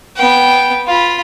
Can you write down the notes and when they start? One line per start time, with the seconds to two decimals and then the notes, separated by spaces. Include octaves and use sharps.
0.16 B3 G5
0.87 F4 B5